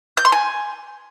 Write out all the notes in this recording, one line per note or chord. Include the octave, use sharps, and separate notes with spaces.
G6
C6
G#5